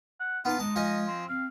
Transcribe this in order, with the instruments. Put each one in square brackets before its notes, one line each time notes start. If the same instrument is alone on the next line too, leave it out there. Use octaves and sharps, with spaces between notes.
[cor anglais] F#5
[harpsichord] B3 A5 [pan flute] D#4 [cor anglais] F4
[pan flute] G#3 [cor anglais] D#4 [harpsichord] A5
[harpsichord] F3 D#5 G#5
[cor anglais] C4
[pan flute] C4 [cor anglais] F5